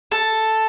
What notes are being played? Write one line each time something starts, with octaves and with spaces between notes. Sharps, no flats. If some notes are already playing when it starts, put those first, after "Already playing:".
A4